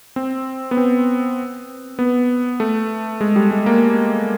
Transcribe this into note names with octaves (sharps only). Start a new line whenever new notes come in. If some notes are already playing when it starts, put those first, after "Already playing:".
C4
B3
C4
B3
A3
G#3
G3
G#3
A#3